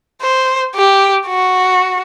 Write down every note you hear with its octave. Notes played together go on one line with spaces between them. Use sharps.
C5
G4
F#4